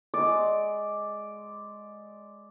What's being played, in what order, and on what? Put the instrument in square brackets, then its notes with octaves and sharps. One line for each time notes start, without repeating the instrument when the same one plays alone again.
[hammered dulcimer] G#3 [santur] D5